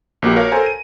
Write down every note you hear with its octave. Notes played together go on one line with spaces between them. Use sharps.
A#1 A#3 F#4 G4
F#4 G4 A#4 C#5 F5
A4 A#4 C5 G#5 A#5
D#7